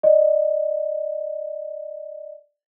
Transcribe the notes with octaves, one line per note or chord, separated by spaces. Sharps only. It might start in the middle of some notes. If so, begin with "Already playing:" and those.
D5 D#5